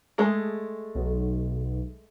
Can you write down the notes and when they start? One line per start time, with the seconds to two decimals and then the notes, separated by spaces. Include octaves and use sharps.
0.18 G#3 A3 G#4
0.95 B1